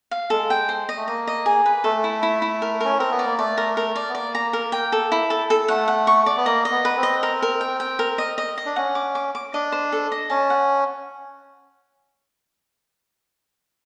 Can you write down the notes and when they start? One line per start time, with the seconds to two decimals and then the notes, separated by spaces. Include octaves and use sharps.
0.11 F5
0.30 G#3 A4
0.50 G5
0.69 C5
0.89 D#5
0.97 A3
1.08 A#3 D#5
1.27 D#5
1.46 G#4
1.66 B4
1.84 A3 A4
2.04 E4
2.23 E4
2.42 E4
2.62 A#4
2.81 C#4 A#4
2.98 C4 A#4
3.11 B3
3.19 D5
3.25 A#3
3.38 A3 D5
3.58 A#4
3.77 A#4
3.96 D5
4.10 B3
4.15 A#3 D5
4.35 A#5
4.53 A#4
4.72 G5
4.92 A4
5.12 E4
5.30 A4
5.50 A4
5.68 A3 F#5
5.88 F#5
6.07 C#6
6.26 D5
6.37 B3
6.46 A#3 D#5
6.65 D#5
6.71 B3
6.85 B4
6.97 C4
7.03 D#5
7.23 A#4
7.42 A#4
7.61 G5
7.80 G5
7.99 A#4
8.18 D#5
8.38 D#5
8.58 D#5
8.66 D4
8.76 C#4 F#5
8.95 D6
9.15 D6
9.35 D6
9.54 D4 D#5
9.72 C5
9.92 A4
10.12 D#5
10.30 C#4 A5
10.50 F#5